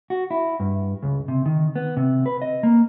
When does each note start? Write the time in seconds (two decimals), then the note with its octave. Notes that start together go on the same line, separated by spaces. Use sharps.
0.10 F#4
0.31 E4
0.60 G2
1.03 C#2
1.28 C3
1.46 D#3
1.76 B3
1.97 C3
2.26 B4
2.42 D#5
2.63 A#3